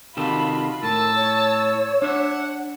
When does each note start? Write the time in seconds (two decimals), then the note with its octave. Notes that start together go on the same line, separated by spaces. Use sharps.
0.17 C3 D#3 F4 F#4 A4 B5
0.83 A2 A#4 A5 E6
1.15 C#5
2.02 D4 E5 F#5